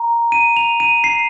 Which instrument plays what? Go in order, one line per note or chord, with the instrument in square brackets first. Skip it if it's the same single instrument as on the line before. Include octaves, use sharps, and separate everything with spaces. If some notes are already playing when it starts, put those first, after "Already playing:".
Already playing: [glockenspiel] A#5
D#7
F7
D#7
C7